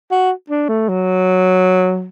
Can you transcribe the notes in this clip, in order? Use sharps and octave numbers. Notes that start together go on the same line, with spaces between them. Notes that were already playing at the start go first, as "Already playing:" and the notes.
F#4
D4
A3
F#3